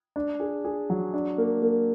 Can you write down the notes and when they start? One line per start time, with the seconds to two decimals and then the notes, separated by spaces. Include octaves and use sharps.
0.16 D4
0.40 G#4
0.65 G#4
0.90 F#3
1.14 D4
1.38 A#3
1.62 A#3